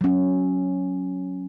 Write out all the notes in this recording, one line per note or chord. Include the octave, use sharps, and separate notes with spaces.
F#3 C#4